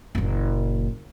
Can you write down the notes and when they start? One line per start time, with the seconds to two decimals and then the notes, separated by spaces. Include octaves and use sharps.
0.15 F#1 A#2